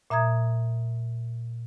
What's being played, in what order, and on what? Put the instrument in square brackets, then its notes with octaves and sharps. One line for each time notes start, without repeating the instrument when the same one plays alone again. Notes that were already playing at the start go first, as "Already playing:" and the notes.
[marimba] A#2 E5 A#5 D#6 G#6